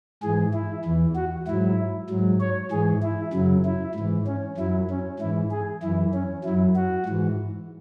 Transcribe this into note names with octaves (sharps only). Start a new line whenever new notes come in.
G#2 E3 G#4
E4
E2 E3
F#4
G#2 F#3 E4
G#2 F#3
C#5
G#2 E3 G#4
E4
F#2 C#3 F#3
E4
G#2 E3
C#4
F#2 F#3 E4
C#4
G#2 E3 E4
G#4
F#2 E3 E4
C#4
F#3 E4
F#2
F#4
G#2 E3